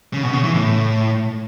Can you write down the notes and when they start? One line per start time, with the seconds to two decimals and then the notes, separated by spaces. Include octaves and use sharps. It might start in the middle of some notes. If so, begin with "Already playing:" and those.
0.14 C#3
0.23 B2
0.33 C#3
0.44 E3
0.54 A2